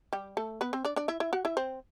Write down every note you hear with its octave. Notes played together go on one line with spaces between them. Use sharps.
G3 G4
A3 A4
B3 B4
C4 C5
D4 D5
D4 D5
E4 E5
E4 E5
F#4 F#5
E4 E5
C4 C5